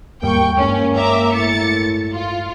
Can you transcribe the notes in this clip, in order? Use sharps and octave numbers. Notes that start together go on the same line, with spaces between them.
D#2 G#2 G3 A#3 G5 C#6
G2 G#3 A#3 C#4
E5 A#5 D6
A2 A6 C#7
F4